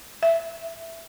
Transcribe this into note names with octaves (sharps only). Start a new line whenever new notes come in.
E5